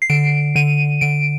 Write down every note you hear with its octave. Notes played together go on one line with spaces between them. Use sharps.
C7
D3 D7
D3 D#7
D3 D7